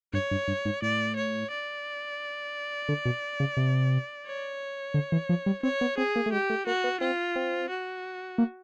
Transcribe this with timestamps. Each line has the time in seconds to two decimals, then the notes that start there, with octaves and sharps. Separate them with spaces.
0.13 G2 C#5
0.31 G2
0.48 G2
0.65 G#2
0.82 A2 D5
1.16 C#5
1.51 D5
2.89 D3
3.05 B2
3.40 C#3
3.57 C3
4.27 C#5
4.94 D3
5.12 E3
5.29 F3
5.46 G3
5.63 C4 C#5
5.81 B3
5.98 C4 G#4
6.16 A#3
6.26 A3
6.33 G#3 G4
6.50 A3
6.67 A#3 F#4
6.84 B3
7.01 C4 F4
7.36 C4
7.70 F#4
8.38 A#3